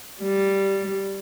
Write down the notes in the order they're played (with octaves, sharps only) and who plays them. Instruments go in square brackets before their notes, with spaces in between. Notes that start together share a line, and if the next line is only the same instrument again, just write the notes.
[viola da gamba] G3